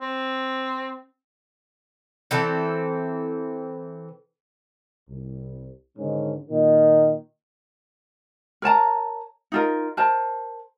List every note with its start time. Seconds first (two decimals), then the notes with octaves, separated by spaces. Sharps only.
0.01 C4
2.31 E3 C4 A4
5.09 C2
5.97 G#2 D3 D#3 C#4
6.49 A#2 D#3
8.62 A#4 C#5 A5 A#5
9.52 D#4 F4 A#4
9.97 A#4 C5 A5